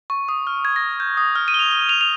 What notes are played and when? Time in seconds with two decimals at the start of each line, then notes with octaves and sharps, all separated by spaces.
0.10 C#6
0.29 D#6
0.47 F6
0.65 G#6
0.76 A#6
1.00 G6
1.17 D#6
1.36 F6
1.48 D#7
1.54 G7
1.59 F7
1.71 G7
1.89 F7
2.01 F7